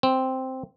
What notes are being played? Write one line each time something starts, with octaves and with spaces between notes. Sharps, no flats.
C4